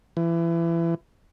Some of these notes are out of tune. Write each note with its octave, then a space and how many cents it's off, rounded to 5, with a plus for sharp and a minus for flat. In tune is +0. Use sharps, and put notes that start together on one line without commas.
E3 +25